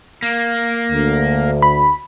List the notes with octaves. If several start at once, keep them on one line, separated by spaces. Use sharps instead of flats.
A#3
D2
B5